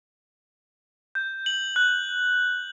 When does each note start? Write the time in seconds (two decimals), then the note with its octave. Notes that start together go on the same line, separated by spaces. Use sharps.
1.15 G6
1.46 F#7
1.76 F#6